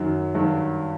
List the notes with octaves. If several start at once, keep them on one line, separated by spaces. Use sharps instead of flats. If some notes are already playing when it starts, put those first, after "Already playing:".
Already playing: F#2 D#3 F#3
G2 D#3 F#3